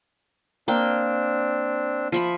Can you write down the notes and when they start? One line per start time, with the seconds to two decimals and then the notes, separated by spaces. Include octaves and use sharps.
0.68 A#3 C4 D4 G5
2.12 F3 E5 B5